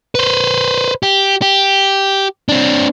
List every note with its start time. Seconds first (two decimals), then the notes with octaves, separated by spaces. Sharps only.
0.15 B4 C5
1.03 G4
1.42 G4
2.49 C4 D4